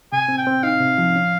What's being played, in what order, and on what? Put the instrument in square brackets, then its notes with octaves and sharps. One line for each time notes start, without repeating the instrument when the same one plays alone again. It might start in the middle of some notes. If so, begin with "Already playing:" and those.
[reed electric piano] C3 [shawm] G#5
[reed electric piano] C4
[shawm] G5
[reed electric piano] C4
[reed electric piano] D#4 [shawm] F5
[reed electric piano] C3
F3
C#4